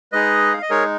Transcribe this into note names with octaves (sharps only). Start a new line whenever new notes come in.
G#3 D#4 G#4 B4 D#5
F5
D#5
G#3 D#4 G#4 A#4 C#5